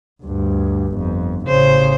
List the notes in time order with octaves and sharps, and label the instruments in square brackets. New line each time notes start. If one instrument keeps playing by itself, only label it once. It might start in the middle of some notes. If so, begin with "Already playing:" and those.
[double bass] D2 G2
G1 F2
[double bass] A1 C#3 [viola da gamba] C5